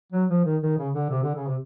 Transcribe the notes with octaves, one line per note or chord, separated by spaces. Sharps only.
F#3
F3
D#3
D#3
C#3
D3
C3
D3
C#3
C3